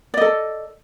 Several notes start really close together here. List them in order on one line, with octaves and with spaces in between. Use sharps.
D5 D#5 A4